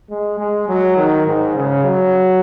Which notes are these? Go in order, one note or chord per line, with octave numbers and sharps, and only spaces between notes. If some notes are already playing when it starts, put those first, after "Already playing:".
G#3
G#3
F#3
D#3
G#2
C#3
F#3